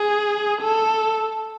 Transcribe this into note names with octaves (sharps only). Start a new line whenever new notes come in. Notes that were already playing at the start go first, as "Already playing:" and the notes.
Already playing: G#4
A4